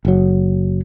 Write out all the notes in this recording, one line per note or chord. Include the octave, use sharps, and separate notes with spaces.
F#1 F#3